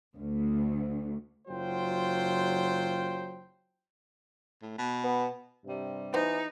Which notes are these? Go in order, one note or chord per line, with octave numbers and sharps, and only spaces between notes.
D2
F#1 F#3 F4 C5 G5
A2
B2
B3
G2 C3 G3
E3 B3 D#4 G4 C5